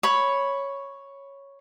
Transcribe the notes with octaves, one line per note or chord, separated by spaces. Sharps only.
C#5 B5